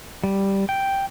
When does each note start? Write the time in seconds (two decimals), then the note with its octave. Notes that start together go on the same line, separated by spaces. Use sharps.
0.24 G3
0.69 G5